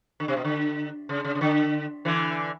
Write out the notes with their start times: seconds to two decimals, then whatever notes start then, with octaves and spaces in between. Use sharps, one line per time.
0.20 D3
0.28 C3
0.37 B2
0.45 D3
1.09 C#3
1.24 C#3
1.35 C#3
1.41 D3
2.05 D3 E3